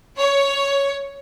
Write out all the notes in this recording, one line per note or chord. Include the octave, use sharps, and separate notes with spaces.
C#5